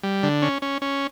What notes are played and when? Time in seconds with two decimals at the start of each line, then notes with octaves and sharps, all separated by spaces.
0.03 G3
0.23 D3
0.42 C#4
0.62 C#4
0.82 C#4